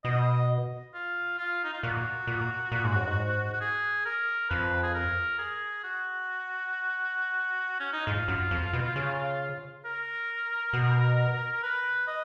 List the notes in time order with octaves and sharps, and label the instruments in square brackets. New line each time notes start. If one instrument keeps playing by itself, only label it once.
[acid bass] B2 [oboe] D#5
[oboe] F4
F4
D#4
F4
[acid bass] A#2 [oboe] F#4
[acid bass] A#2
A#2
G#2
F#2
G#2
[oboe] F#4
G#4
A#4
[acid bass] F2 [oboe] B4
[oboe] G#4
A#4
G#4
F#4
C#4
D#4
[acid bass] G#2 [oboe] F4
[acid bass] F#2
F2
B2
C#3
[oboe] A#4
[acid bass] B2
[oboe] B4
D#5